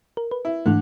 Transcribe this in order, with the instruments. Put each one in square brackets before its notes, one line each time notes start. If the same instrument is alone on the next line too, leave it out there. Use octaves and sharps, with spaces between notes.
[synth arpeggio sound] A#4
B4
[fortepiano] E4
[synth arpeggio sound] G#2 E3 A3 [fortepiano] D3